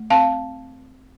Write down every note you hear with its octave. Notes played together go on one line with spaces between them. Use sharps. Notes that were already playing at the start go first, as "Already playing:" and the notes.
Already playing: A3
C4 F5 A5